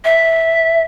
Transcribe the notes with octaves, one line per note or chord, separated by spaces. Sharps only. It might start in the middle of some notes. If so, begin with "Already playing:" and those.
E5